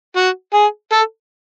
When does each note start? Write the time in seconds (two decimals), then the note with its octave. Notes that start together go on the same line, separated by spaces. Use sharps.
0.16 F#4
0.54 G#4
0.93 A4